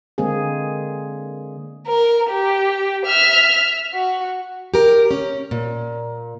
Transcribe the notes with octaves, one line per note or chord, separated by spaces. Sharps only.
D3 G#3 A#3 C4 G#4
A#4
G4
E5 F6
F#4
G4 A#4
C#4
A#2